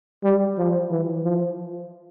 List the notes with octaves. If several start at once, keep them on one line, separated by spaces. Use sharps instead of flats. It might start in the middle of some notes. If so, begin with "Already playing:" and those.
G3
F3
E3
F3